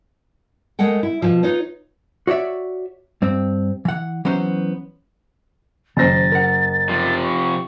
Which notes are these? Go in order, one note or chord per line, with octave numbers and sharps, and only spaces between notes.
G#3 A3 A#4 F#5 G5
E4
B2 E3 F3
D#4 F4 B4 C#5 D#5
F#4 C#5 D5 E5
G2 C4
E3 F#5
E3 F#3 B3 C#4 C5
F#1 D#3 C5 A6 A#6
A#4 F#5
C3 F3
C#6